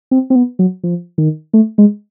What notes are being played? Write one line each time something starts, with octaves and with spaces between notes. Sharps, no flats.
C4
C4
B3
F#3
F3
D#3
A3
G#3